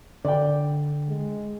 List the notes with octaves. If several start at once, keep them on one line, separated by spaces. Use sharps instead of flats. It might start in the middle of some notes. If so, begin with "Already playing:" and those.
D3 D5 G5
G#3